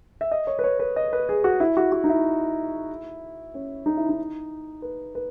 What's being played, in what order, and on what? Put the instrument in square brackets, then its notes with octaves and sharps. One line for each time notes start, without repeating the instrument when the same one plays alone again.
[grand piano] E5
D#5
C#5
B4
C#5
B4
D#5
B4
G#4
F#4
E4
F#4
F#4
D#4
E4
C#4
D#4
E4
D#4
B4
B4